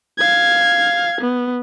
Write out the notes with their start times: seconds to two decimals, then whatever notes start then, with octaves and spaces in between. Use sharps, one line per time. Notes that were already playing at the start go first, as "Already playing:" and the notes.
0.19 F5 G#6
1.21 B3